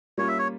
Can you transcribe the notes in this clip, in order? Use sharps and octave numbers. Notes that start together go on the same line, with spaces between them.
G3 A#3 C#4 F4 C#5
E5
C#5